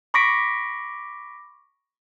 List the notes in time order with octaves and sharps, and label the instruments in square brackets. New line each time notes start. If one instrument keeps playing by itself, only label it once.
[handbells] B5 C#6 D6 A#6 B6 D7